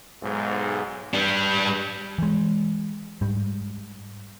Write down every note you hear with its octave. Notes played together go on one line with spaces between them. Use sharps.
B1 G#2
G3 D4
E3 G#3
G#2 G3